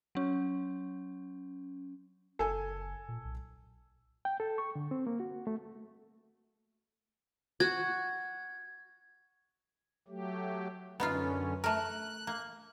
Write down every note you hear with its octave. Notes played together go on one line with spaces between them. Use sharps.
F#3 C#4
F#1 A4 G#5
A#2
B1
G5
A4
C#6
D3
C4
A#3
F#4
A3
F#4 G#6
F#3 A3 G4
F#2 D3 B3 C#4 D#4 F4
A3 A#4 F#6
A#3